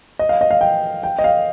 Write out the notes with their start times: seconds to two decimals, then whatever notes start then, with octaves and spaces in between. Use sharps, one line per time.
0.19 D#5
0.29 F5
0.41 D#5
0.51 F5
0.61 G5
1.03 G5
1.19 D#5
1.24 F5